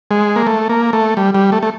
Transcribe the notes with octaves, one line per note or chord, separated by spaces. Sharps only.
G#3
A#3
A3
A#3
A3
G3
G3
A3
A3